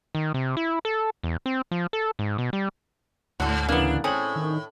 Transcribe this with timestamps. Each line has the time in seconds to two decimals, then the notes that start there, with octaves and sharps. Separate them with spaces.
0.15 D#3
0.34 C3
0.57 E4
0.85 A4
1.23 E2
1.46 C4
1.71 F3
1.93 A4
2.19 G#2
2.38 B2
2.53 G3
3.40 D2 G#2 F#4 A4
3.69 A2 C#3 E3 A#3 B3 D4
4.04 A2 C4 C#4 G#4 A4 F#7
4.36 D#3